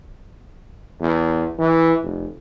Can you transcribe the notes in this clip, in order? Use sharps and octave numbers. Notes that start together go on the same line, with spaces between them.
E2
E3
F1